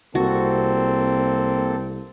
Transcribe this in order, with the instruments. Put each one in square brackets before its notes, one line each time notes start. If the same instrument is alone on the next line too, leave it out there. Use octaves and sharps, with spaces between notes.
[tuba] C2 [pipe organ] A#3 A4 [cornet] C4 [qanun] F#4